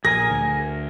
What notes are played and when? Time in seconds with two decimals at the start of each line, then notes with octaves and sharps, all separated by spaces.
0.05 A#1 G#4 A#4 G#5 A#6
0.30 D2